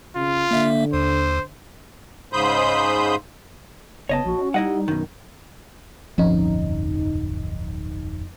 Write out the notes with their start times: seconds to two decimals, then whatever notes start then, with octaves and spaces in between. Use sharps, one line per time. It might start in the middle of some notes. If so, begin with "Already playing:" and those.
0.16 C#3 F4
0.51 D3 A#3 E5
0.93 D#2 C5
2.33 G#2 C#3 C5 B5 D#6 G6
4.09 F#1 B3 C#5 D#5 A5
4.26 A#1 F#4
4.38 C#4
4.54 G3 D#4 E4 D#5 F#5
4.88 F#2 B2 D#3
6.18 D1 G1 F2 C#4 D#4